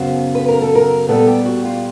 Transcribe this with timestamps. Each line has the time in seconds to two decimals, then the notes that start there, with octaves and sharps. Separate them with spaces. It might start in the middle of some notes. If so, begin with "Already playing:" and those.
Already playing: F#2 C#3 F#3 B3 C5
0.35 B4
0.48 A#4
0.61 A4
0.75 A#4
1.09 A#2 G3 B3 A4
1.27 G4
1.45 F#4
1.65 F4